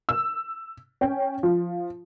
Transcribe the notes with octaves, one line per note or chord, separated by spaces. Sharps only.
E6
C#4 G5
F3